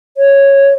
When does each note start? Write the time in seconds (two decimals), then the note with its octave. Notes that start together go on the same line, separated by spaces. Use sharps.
0.17 C#5